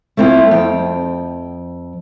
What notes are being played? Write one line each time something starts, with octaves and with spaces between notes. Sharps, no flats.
A3 A#3 C4 E4 F4
F2 G5